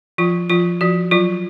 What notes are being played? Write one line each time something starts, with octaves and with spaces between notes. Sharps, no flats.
F3 F4
F3 F4
F3 F#4
F#3 F4